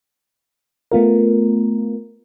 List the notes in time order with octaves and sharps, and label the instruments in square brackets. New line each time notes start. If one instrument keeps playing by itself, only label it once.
[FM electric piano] A3 B3 F4 A#4